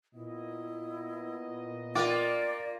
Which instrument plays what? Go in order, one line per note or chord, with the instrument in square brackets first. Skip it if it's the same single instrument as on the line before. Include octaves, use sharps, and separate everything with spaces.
[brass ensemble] A#2 B3 D#5 [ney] E4
[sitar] A#3 F4 [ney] D5 [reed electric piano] G5 D6 A6